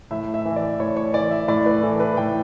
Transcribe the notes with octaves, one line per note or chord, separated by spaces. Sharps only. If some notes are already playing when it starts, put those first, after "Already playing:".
A2 E5
E5
E3
D5
A2 C#5
C#5
E3 D5
E5
A2 D5
B4
E3 A4
B4
A2 G5